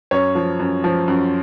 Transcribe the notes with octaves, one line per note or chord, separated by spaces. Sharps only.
F#2 C#5
F3
F#2
F3
F#2